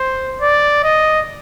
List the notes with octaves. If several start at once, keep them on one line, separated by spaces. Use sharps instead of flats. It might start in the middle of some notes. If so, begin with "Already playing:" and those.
Already playing: C5
D5
D#5